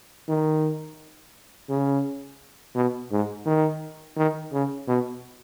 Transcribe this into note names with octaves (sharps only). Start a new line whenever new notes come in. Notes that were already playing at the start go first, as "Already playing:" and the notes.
D#3
C#3
B2
G#2
D#3
D#3
C#3
B2